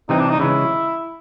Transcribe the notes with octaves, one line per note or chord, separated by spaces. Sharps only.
C3 E3 G3 C4 D#4
D4
D#4
C#3 E3 G#3 E4